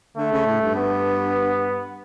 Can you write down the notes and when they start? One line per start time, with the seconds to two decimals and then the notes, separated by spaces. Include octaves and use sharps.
0.17 D3 A3
0.32 C#3
0.47 A2
0.61 G2
0.76 B3